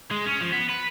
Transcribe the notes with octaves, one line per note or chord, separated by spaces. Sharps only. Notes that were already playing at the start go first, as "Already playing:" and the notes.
G#3
C#4
F3
B3
B4